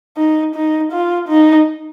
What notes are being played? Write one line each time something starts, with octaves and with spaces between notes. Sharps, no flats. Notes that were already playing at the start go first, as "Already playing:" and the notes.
D#4
D#4
F4
D#4